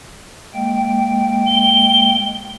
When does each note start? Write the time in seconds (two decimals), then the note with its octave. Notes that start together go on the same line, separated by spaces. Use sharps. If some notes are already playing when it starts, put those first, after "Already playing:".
0.54 G#3 A#3 G5
1.46 G7